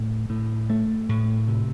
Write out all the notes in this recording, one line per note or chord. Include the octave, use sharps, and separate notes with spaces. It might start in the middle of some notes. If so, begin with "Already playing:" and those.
Already playing: A2
A2
A3
A2
C3